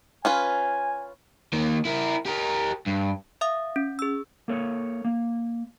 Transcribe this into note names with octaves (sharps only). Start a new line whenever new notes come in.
C#4 F4 B4 G#5
D#3 A#3
E4 A#4
G4 A#4
G2
E5 F5 D#6
C#4
G#4 E6
A#3 A4 A#4 C#5
A#3